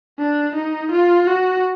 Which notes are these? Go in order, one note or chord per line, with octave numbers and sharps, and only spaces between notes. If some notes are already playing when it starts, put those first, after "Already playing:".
D4
D#4
F4
F#4